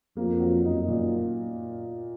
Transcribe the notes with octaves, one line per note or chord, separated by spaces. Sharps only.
F2 A#3
F#3
F#2 D#4
A#2